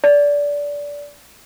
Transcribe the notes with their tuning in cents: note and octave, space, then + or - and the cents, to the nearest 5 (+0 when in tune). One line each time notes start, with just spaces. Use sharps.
D5 -20